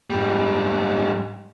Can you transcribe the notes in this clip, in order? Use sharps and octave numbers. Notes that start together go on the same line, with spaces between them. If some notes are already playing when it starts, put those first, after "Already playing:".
G#2 G3